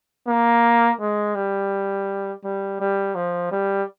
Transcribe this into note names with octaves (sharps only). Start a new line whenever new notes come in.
A#3
G#3
G3
G3
G3
F3
G3